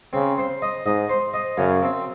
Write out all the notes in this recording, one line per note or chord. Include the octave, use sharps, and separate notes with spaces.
C#3 C4
C5
D#5
G#2 D#5
C5
D#5
F#2 C#3
C4